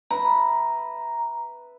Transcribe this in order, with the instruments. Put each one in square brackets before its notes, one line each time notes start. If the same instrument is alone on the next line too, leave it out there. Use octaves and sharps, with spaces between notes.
[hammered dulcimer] B4 E5 [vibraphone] A#5